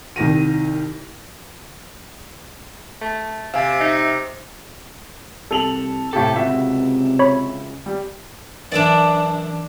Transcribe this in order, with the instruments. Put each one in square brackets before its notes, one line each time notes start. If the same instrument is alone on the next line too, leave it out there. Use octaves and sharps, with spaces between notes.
[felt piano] C2 D#3 A#6 D#7
[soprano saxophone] A3
[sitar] C3 [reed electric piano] F5 G#5 A6
[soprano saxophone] D#4 [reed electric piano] E5
[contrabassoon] C2 [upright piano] A4 F7 F#7
[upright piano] A2 C3 G4 [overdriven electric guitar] A4
[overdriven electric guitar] C#2 [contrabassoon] C3 [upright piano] F#4 E5
[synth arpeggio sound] C#5 B5
[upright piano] G3
[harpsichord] F#2 E3 E4 [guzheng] D4 D5